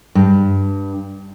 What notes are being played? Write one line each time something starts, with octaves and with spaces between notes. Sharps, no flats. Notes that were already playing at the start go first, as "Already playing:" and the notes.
G2